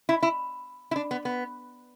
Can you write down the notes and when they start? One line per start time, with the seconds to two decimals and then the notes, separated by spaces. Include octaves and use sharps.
0.09 E4
0.23 E4
0.91 E4
0.96 D4
1.11 B3
1.25 B3